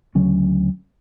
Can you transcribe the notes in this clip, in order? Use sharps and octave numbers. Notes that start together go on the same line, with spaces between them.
D2 C#3 F#3 C#4